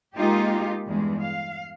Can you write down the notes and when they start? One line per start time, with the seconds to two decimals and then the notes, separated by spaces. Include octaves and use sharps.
0.16 G#3 A#3 D#4 F4 G4
0.87 E2 G2 G#3
1.22 F5